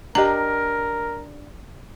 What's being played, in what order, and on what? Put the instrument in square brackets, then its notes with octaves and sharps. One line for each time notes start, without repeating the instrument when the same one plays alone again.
[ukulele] D4 G4 D#5 [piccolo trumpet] A#4 [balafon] A#5